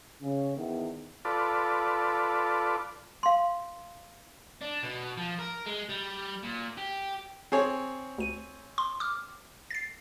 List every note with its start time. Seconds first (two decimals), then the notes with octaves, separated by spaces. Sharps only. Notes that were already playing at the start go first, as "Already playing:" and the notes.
0.21 C#3
0.57 E2 D#3 B3
1.25 F4 A4 B4 D5
3.23 F5 C6
4.61 D4
4.83 B2
5.17 F3
5.39 A#4
5.66 G#3
5.89 G3
6.43 A#2
6.78 G4
7.52 C4 G#4 C#5
8.18 D2 D#7
8.78 C6
9.00 D6 F6
9.71 A6 C7